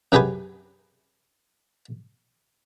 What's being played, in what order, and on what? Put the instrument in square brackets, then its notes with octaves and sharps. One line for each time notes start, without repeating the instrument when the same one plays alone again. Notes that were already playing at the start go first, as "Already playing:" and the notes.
[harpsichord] F#2 F#3 G4 G#4 B4 G#5